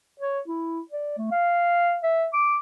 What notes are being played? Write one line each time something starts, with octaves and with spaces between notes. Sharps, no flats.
C#5
E4
D5
A3
F5
E5
D6